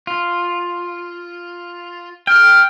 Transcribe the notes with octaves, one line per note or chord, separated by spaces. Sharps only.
F4
G5 F6